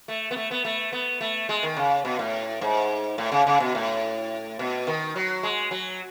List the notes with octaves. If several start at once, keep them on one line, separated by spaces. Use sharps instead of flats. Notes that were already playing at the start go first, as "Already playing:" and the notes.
A3
B3
A3
B3
A3
B3
A3
G#3
D#3
C#3
B2
A2
G#2
A2
C#3
C#3
B2
A2
B2
D#3
F#3
G#3
F#3